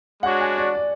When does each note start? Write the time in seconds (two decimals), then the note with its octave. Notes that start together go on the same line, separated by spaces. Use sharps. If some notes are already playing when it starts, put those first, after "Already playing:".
0.22 G#3 D4 F#4 C#5 F#5
0.41 G#5
0.58 D5
0.75 D5